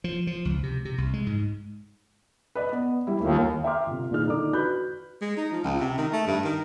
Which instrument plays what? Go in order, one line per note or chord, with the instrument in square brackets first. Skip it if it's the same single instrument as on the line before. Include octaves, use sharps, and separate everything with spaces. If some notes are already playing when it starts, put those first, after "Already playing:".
[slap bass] F3
F3
C#2
C3
C3
C2
G#3
G#2
[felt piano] B4 D5 D#5
B3
G3 E4
[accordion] D#2 [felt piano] G3 A3 F4
[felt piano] E5 G5 A#5 C6 D6 F6
G1 C3
D#1 A#2 D#3 D4 G#4 F6
D3 D#4 A4 D5 D6
F#4 B4 B5 F#6 G6
[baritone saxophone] G#3
D#4
F3
C#2
C3
D#3
A3
G2
D#3